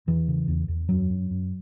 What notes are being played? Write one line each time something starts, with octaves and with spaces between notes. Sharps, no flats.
E2 E3
C#3
E2
E2
F#2 F#3
F#2
F#2